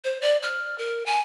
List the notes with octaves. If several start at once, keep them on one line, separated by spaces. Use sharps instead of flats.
C5
D5
F6
A#4
G#5